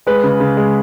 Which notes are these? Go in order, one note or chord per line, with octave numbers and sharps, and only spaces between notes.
G#3 B4
C#3
C#3
G#3